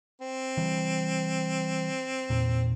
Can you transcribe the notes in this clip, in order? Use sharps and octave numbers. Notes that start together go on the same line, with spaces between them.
C4
E3 G3
E2 A#2